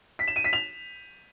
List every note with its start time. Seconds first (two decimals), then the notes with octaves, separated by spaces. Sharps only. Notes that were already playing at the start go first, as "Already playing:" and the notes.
0.19 B6
0.28 E7
0.36 D#7
0.44 B6
0.53 F7